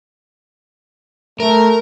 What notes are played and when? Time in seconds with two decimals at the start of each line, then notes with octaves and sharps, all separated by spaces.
1.40 A3 A#4